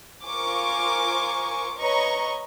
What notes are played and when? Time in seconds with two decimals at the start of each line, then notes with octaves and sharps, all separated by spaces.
0.25 F4 A#4 C5 G#5 C#6 D6
1.78 B4 C#5 D#5 A#5 C#6